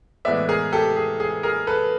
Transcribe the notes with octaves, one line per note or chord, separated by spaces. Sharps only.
A2 E3 G#3 B3 D5 E5
G#4 A#4
G4 A4
G#4
G#4
G#4 A#4
A4 B4